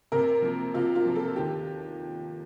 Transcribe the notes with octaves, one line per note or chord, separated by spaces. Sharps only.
C3 A#4
F3 A#3
C3 F4
F4
F3 A#3
A4
D#2 G4